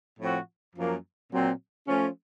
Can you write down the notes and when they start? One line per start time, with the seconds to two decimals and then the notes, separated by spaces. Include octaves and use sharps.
0.19 A2 F3 C4 F#4
0.76 F#2 F3 A#3
1.32 A#2 F#3 C4
1.87 F3 A3 C#4